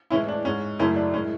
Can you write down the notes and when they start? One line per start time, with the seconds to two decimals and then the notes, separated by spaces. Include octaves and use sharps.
0.10 A2 E3 G#3 C#4 E4
0.28 D4
0.45 G#2 G#3 C#4
0.79 F#2 C#3 F#3 A3 C#4 E4
0.96 D4
1.14 A2 G#3 C#4